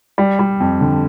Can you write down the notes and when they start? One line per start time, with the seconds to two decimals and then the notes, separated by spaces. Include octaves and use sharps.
0.18 G3
0.39 G3
0.60 F2
0.81 D3